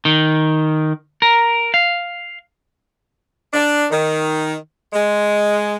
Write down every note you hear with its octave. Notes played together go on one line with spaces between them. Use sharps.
D#3
A#4
F5
D4
D#3
G#3